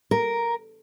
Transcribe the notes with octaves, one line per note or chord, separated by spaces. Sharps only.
A#4